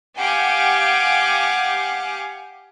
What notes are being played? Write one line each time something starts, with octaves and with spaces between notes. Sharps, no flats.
G4 F5 F#5 G#5 D6